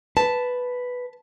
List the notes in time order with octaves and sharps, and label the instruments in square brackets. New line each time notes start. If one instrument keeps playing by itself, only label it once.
[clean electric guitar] B4 [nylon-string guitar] A5